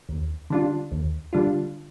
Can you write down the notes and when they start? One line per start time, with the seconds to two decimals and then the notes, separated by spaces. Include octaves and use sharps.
0.09 D#2
0.50 D3 G3 D4 F4
0.91 D#2
1.33 D3 G3 D4 F4